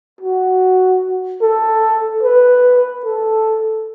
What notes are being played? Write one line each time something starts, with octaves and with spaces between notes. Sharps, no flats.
F#4
A4
B4
A4